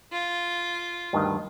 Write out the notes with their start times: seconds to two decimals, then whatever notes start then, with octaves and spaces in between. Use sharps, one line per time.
0.12 F4
1.13 D2 G2 D#3